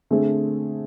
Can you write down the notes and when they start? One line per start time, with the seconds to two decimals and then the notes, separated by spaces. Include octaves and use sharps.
0.10 D3 A3 C4 G#4